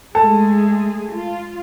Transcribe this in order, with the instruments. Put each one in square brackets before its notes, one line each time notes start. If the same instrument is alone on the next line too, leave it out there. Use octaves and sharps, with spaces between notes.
[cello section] G#3 A3 G#4 [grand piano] A4
[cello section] F4